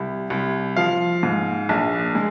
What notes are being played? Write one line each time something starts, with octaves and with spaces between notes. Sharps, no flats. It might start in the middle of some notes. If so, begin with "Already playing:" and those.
Already playing: C2
C2
F3 F5
G#2
A#1
G#3